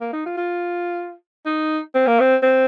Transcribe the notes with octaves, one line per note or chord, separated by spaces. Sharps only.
A#3
D#4
F4
F4
D#4
C4
A#3
C4
C4